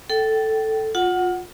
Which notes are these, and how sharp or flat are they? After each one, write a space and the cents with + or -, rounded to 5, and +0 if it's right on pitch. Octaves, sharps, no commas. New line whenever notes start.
A4 +0 G5 -30
F4 +25 F#5 +0